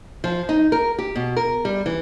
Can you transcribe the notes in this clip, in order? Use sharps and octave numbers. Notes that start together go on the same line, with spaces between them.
F3
D#4
A#4
G4
B2
A#4
G3
E3